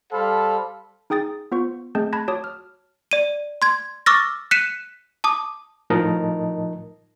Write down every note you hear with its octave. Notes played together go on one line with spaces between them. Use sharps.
G3 A4 C5 F5 A5 B5
D#4 G#4 G5 D#6 A6
B3 F4 C5 C#6
A3 C4 G#4 D#5 A5 G6
A5 B5 F#6 G#6 A#6
F#4 C#5 A5 D6 D#6
F6
D5 D#7
C6 G#6
C#6 D6 E6 F6 A6 A#6
F#6 B6 C#7 D#7 E7
A5 D6 D#6
A2 F3 D#4 A#4 D#5 A5